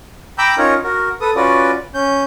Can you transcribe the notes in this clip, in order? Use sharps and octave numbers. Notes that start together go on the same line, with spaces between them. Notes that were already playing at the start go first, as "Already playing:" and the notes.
G5 A#5 B5 D6 E6 G6
C#4 D#4 F4 A#4 C#5
F#4 A#4
A4 B4 D#6
C#4 F4 F#4 B4 D5
C#4 G6